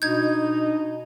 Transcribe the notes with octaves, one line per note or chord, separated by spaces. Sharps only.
B2 D4 D#4 G6 G#6